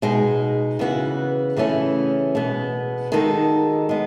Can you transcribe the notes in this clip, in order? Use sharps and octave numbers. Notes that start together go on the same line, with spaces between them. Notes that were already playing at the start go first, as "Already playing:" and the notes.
B2 G#3 D#4
C#3 E3 B3 F#4
C#3 E3 A3 C#4 E4
B2 G#3 B3
D#3 G#3 D#4 F#4 A4
G#3 B3